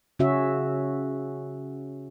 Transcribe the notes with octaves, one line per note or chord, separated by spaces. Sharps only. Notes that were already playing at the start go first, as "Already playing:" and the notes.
C#3 C#4 F#4 E5